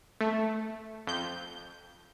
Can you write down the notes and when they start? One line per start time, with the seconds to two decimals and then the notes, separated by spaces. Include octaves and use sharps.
0.21 A3
1.07 F2 G6